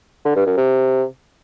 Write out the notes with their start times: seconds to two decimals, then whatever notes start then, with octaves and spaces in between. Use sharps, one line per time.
0.25 D3
0.36 G2
0.46 F#2
0.57 C3